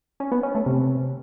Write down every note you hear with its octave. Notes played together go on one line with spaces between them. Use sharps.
C#4
B3
C#4
A3
C3